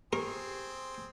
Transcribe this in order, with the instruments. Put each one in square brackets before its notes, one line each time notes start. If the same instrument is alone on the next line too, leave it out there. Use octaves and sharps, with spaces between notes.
[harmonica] C4 G#4 C6 [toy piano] G4 [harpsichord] A#4